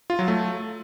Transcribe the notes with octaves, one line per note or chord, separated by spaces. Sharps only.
F4
F#3
A3